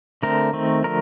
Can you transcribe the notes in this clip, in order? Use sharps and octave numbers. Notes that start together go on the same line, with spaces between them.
D3 A3 C4 A#4
D#3 A3 C4
D3 F3 A3 A#4